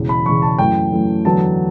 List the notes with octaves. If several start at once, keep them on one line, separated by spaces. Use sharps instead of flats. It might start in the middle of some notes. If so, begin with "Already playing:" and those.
Already playing: E1 E2 C#3
B5
E1 E2 C#3 C#6
A5
F#2 E3 A3 G5
F#2 E3 A3
E2 D3 F#3 B3 A5